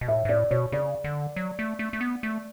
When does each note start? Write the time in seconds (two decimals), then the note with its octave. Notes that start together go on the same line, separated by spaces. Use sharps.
0.01 B2
0.08 A2 E5
0.25 G#2
0.29 A2 D5
0.51 B2 C#5
0.72 C#3 D5
1.04 D3
1.36 F#3
1.59 A3
1.79 A3
1.93 A3
2.01 B3
2.23 A3